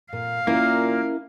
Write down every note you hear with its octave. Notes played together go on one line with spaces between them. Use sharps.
A#2 F5
A#2 A#3 C#4 E4 A#4